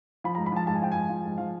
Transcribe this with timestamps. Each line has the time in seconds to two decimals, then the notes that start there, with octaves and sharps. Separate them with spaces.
0.24 F3 B5
0.35 A#5
0.38 G#2
0.46 B5
0.52 F3 A5
0.67 G#2 A5
0.75 G#5
0.82 F3 G5
0.92 G#2 G#5
1.10 F3
1.25 G#2
1.38 F3 F5